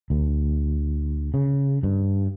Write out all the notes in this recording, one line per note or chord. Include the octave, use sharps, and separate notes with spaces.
D2
C#3
G2